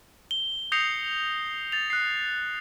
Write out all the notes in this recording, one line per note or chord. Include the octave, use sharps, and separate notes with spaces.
G7
D#6 G6 A#6 C7 C#7 F7
A6 F7
F#6 C7